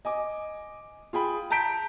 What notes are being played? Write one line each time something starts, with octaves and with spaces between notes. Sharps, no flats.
D#5 G#5 D6
F4 G#4 G5 B5
A5 A#5 G6 B6 D7